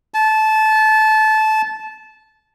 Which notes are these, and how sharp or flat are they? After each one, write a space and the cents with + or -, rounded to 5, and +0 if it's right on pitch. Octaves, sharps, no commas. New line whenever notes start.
A5 -20